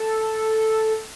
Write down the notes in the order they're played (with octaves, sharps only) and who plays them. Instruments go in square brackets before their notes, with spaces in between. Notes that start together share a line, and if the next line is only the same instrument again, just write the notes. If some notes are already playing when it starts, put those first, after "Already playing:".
Already playing: [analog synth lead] A4